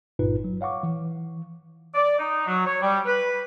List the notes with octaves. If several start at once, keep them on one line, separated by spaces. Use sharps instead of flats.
G1 G2 A#2 D#4 F4 B4
F#3
C#5 F5 F#5 C#6 D6
E3
D5
D#4
F#3
C#5
G3
B4